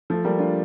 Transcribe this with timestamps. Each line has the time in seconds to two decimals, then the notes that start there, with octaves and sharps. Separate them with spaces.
0.10 F3 A3
0.25 G3 A#3
0.39 D4 F4